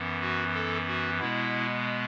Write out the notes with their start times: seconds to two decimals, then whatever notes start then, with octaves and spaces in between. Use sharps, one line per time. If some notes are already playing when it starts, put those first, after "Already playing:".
Already playing: F#2 E3 B3
0.21 F#4
0.55 A4
0.87 F#4
1.20 B2 G#3 B3 E4